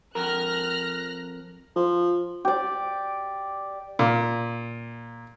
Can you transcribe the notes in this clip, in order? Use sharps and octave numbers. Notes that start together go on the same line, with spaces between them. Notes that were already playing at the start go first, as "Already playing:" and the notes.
F2 A#4 F6 F#6 A#6
F3
G4 D5
A#2